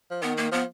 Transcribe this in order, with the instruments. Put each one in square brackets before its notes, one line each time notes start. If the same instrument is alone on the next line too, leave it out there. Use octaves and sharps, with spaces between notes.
[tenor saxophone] F3
[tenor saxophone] D#3 [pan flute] B3
[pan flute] A#3
[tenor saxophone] F3 [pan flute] B3